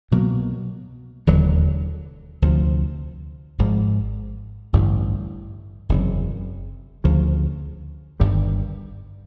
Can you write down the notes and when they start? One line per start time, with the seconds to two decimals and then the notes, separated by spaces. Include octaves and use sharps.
0.11 C2 B2 F#3 A#3
1.27 E1 D#2 D3 F#3
2.42 D2 C3 F3
3.58 G#1 G#2 F3
4.73 A1 G2 D3 G3
5.89 F#1 E2 C3
7.04 D2 C#3 F3
8.20 G1 G2 D#3 G3